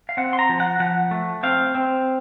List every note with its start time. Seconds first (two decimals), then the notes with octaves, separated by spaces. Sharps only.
0.09 F5
0.17 C4 F#5
0.33 C6
0.39 A#5
0.49 F3
0.60 F#5
0.80 F3 F#5
1.11 A3
1.43 C4 F5
1.75 C4